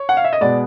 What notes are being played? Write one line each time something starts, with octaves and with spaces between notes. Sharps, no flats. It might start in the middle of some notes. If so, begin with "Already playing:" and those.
Already playing: C#5
F#5
F5
E5
D#5
B2 G#3 B3 D5